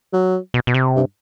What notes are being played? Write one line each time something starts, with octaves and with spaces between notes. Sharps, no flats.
F#3
B2
B2
C3
G2